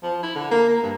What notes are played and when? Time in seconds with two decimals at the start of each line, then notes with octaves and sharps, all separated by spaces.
0.03 F3
0.23 E4
0.35 D3
0.51 A#3
0.69 A#3
0.83 G2